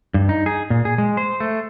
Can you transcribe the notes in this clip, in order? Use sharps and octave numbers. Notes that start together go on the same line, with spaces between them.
G2
D#4
G#4
A#2
G#4
G#3
C5
A3